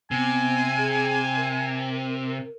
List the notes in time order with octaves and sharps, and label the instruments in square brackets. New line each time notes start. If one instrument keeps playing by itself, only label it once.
[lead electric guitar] C3 [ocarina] B3 [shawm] G#5
[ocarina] G#4
A#4